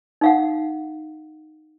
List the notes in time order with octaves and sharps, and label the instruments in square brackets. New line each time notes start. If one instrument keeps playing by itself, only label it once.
[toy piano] D#4 F5 F#5